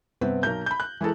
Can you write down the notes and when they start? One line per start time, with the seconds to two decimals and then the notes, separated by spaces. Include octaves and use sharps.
0.21 G2 C3 B3 C4
0.43 B1 A#4 G6
0.66 B5 G6
0.80 F#6
1.01 E3 G#3 E4 A4 A#4